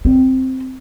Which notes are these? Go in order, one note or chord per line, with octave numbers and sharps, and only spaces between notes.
C4